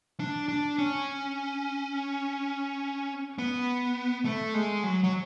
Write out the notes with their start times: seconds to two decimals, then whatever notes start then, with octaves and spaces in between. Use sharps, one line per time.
0.20 D4
0.49 D4
0.79 C#4
3.38 B3
4.25 A3
4.54 G#3
4.83 F#3
5.04 F#3